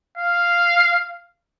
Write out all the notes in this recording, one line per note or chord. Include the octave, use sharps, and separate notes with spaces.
F5